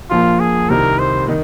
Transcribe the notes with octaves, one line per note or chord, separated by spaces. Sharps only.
A#1 A#2 F3 A#3 F4
G#4
C2 C3 D#3 A#4
C5
D#3 D#4